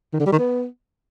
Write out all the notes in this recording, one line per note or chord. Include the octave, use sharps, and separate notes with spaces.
D#3
D3
G3
D#3
B3